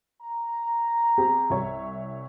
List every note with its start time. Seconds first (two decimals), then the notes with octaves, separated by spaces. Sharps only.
0.22 A#5
1.18 C4 G4 G#4
1.50 C2 C#5 E5